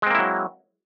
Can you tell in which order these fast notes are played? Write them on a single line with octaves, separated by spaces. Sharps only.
G#3 C4 A#3 E4 F#3